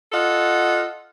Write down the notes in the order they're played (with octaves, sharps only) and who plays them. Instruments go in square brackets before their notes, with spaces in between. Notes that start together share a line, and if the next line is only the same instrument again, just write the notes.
[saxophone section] F4 A4 D#5 F#5